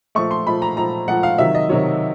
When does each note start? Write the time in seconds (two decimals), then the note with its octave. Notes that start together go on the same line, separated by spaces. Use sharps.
0.15 A#2 F3 A3 C#6
0.31 C6
0.46 A#2 F3 A3 B5
0.62 A#5
0.77 A#2 F3 A3 A#5
1.08 A#2 F3 A3 F#5
1.23 F5
1.38 C3 D#3 F#3 E5
1.55 D#5
1.69 C3 D#3 F#3 C#5